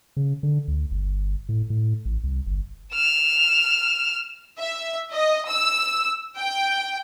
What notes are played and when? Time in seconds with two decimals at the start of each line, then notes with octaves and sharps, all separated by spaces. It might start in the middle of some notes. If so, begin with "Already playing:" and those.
0.17 C#3
0.43 D3
0.68 D2
0.91 G1
1.49 A2
1.70 A2
2.05 A1
2.24 C2
2.47 G1
2.92 F6 E7
4.59 E5
5.12 D#5
5.49 E6
6.37 G5